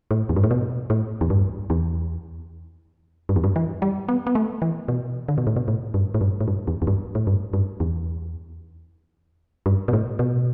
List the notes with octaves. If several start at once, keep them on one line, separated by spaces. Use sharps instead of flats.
A2
E2
G2
A2
B2
A2
E2
G2
E2
G2
E2
G2
E3
G3
B3
B3
A3
E3
B2
D3
B2
A2
B2
A2
G2
A2
G2
A2
G2
E2
E2
G2
A2
G2
G2
E2
G2
B2
A2
B2